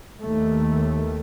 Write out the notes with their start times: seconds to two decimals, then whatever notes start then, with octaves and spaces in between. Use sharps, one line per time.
0.22 D#2 D#3 A3